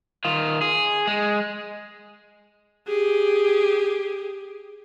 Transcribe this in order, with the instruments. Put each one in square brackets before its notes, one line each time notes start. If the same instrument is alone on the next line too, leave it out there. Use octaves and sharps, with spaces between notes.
[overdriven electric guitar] D#3 F4
G#4
G#3
[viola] G4 G#4